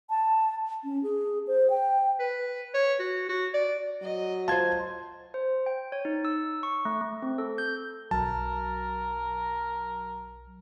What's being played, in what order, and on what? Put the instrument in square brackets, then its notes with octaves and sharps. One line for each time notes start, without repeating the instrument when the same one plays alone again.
[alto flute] A5
C#4
G#4
C5
G5
[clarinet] B4
C#5
F#4
F#4
D5
[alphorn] F#3 [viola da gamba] D#5
[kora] F4 C5 [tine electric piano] A5 G#6
[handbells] C5
G5
C#5
D#4
E6
C#6
A3
A3
C4
A4
G6
[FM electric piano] B1 F#3 [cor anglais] A#4 [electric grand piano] A5